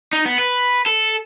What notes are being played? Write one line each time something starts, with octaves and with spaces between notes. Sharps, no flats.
D#4
B3
B4
A4